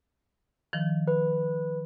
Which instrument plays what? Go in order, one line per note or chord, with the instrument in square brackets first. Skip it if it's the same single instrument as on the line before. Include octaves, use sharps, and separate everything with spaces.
[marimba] D#3 F3
[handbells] B4